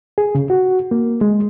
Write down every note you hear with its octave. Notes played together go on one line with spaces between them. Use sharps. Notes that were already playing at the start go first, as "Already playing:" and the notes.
G#4
C#3
F#4
A#3
G#3